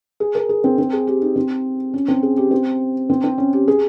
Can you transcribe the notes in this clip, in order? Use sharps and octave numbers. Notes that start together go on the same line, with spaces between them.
G#4
A#4
G#4
C4
C4
G#4
G4
D#4
C4
C#4
C4
G#4
G4
C4
C4
C4
C#4
G4
G#4